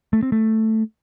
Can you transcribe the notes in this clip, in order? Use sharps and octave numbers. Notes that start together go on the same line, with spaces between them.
A3
C4
A3